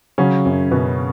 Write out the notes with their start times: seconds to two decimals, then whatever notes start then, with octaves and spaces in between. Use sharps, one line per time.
0.18 C#3 F#3 C#4
0.45 F#2
0.71 F#2 B2 B3